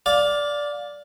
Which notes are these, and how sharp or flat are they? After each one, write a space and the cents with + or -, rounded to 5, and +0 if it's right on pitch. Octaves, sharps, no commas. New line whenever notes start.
D5 -5 F5 +20